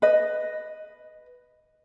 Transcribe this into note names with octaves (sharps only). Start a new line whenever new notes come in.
B4 D#5